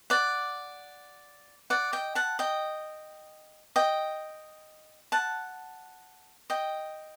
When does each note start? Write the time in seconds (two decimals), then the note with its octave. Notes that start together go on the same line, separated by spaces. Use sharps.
0.10 D5 F#5
1.70 D5 F#5
1.93 D#5 G5
2.15 F#5 A5
2.39 D#5 G5
3.76 D#5 G5
5.12 F#5 A5
6.50 D#5 G5